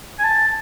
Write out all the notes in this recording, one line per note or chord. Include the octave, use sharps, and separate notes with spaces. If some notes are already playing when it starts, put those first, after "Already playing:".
G#5
A5